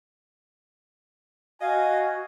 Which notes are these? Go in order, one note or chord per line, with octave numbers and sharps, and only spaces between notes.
F#4 D#5 F5 G#5